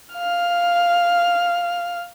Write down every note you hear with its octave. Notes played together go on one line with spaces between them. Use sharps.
F5 F6